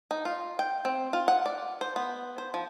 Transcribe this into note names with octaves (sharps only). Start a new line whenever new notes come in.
D#4
F4
G5
C4
F4
F#5
D5
C5
B3
C5
F3